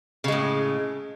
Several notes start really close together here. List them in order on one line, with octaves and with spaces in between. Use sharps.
C#3 G#3 A2